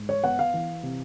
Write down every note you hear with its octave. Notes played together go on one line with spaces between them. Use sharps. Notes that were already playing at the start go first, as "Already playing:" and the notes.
Already playing: G#2
C#5
B3 F#5
F5
E3
C3